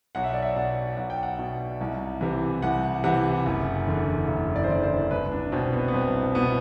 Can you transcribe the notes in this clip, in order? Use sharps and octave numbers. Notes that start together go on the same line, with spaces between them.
B1 F#5
E5
D5
E5
B2 F#5
B1 F#5
G5
F#5
B2
C2
C3 E3
C2 F#5
C3 E3 F#5
F#1
E2 D3
F#1
D5
C5
E2 D3 D5
C5
C2 B4
D4
B2 C4
B3
B3
C2 C4
B2 B3